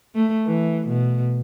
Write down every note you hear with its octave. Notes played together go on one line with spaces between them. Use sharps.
A3
E3
B2